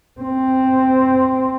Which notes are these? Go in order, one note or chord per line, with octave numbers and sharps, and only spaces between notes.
C4